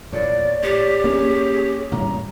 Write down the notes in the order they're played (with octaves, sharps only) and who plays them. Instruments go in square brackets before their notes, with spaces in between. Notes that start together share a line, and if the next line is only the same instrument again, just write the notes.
[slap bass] E2 A#2 [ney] C#5 [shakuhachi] D5
[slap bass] A2 [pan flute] G4 [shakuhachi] D5
[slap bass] A#3 C#4 [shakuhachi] G#4
[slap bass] A1 A2 G3 [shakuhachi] A#5